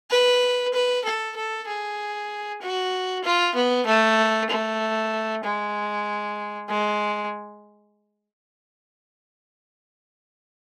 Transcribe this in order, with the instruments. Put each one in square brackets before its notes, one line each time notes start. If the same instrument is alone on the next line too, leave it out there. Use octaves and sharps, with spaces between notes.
[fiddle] B4
B4
A4
A4
G#4
F#4
F4
B3
A3
A3
G#3
G#3